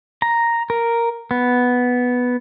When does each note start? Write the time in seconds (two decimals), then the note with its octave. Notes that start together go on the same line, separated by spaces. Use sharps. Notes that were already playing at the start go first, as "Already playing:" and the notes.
0.22 A#5
0.70 A#4
1.31 B3